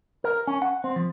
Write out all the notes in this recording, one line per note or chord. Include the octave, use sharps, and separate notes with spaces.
A#4
C#4
F#5
C4
F3